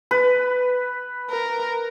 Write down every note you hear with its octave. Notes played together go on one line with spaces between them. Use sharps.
B4
A#4